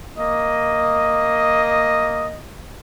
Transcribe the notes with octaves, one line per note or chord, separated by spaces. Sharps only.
A#3 D#5